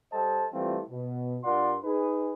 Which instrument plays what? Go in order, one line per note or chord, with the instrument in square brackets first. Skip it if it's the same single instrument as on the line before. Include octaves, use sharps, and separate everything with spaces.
[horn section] G3 A4 C5 D#5 G5 A5
E3 G3 A3 C4 F4
B2
G2 F4 A#4 D5 F#5 C6
D#4 G#4 B4